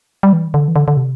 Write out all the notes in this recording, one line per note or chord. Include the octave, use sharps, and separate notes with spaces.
G3
E3
D3
E3
D3
D3
C3